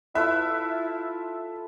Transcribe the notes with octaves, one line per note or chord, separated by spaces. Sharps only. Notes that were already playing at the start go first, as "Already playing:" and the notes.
E4 F4 A4 B4 E5